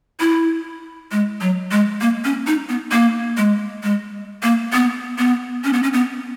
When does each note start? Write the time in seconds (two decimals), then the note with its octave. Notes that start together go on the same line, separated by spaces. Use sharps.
0.20 E4
1.12 G#3
1.41 F#3
1.71 G#3
2.01 A#3
2.24 C#4
2.47 D#4
2.69 B3
2.92 A#3
3.37 G#3
3.83 G#3
4.43 A#3
4.73 B3
5.18 B3
5.64 C#4
5.73 B3
5.83 C#4
5.93 B3